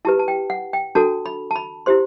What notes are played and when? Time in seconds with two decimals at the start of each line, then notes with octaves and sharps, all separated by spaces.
0.05 E4 G4 B4 A5
0.19 A5
0.28 G5
0.50 F#5
0.73 G5
0.95 D4 F#4 A4 A5
1.26 B5
1.51 A5
1.56 B5
1.86 E4 G4 C5 C6